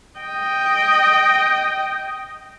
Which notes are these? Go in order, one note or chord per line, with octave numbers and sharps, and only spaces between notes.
D#5 G5